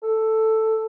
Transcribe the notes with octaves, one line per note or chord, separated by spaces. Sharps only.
A4